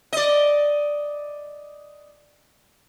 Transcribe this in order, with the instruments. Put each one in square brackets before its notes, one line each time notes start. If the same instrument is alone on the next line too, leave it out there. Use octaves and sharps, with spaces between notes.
[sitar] D5 D#5